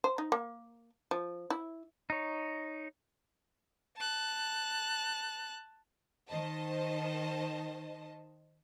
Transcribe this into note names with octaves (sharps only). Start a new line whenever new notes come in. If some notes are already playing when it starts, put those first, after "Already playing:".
C5
D#4
A#3
F3
E4
D#4 C#5
A5 F#6
D#3 C5 D#5 A5